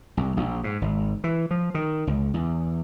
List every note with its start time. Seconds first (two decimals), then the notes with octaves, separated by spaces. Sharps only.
0.17 C2
0.37 A#1
0.64 G#2
0.82 G#1
1.24 E3
1.51 F3
1.74 D#3
2.07 C#2
2.34 E2